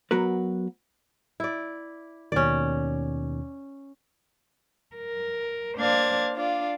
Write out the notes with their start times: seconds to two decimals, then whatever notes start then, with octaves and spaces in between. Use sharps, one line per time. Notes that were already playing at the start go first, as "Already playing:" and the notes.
0.11 F#3 B3 F#4 A#4 B4
1.40 E4 D5
2.32 D#2 B2 D#3 C#4 D5
4.95 A#4
5.76 A#3 D4 C5 F5 G#6 A6
6.33 D4 F4 D5